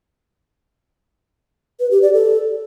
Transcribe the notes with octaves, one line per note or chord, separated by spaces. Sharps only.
B4
G4
D5
A4